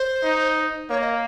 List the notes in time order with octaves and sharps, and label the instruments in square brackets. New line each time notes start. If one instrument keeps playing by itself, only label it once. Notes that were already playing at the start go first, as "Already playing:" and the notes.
Already playing: [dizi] C5
[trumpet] D#4
[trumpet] A#3 [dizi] C#5
[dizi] D#5